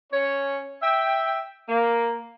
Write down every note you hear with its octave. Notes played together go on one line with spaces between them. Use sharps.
C#4 C#5
E5 G5
A#3